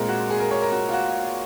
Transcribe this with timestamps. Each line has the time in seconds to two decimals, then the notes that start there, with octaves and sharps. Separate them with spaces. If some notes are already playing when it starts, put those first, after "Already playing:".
Already playing: A#2 G#3 C4 A#4
0.09 F#4
0.30 G#4
0.40 A#4
0.51 C#5
0.62 A#4
0.72 F#4
0.89 F4
0.93 F#4